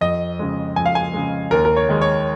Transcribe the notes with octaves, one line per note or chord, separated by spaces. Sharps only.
F2 D#5
C#3 G#3
F2 G#5
F5
G#5
C#3 G#3
D#2 A#4
A#4
C#5
D#3 G#3
C#5